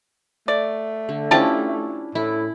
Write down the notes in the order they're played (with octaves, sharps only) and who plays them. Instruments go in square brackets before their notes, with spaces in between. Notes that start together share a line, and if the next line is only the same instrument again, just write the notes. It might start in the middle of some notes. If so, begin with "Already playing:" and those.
[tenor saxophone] A3 [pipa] D5
[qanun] D3
[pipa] F3 G4 A5 [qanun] C#4 D4 E4
[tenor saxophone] A2 [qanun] E4